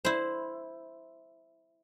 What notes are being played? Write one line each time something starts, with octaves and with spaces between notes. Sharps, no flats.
E4 C5